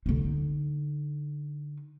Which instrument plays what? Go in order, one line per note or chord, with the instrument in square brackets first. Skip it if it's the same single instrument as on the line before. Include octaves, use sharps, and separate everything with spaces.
[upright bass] D3 D#4